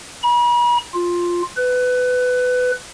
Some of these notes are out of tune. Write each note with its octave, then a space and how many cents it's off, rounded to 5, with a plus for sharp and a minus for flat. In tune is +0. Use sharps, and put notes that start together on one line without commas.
B5 -45
F4 +5
B4 +20